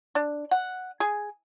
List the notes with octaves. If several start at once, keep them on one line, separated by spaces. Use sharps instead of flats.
D4
F#5
G#4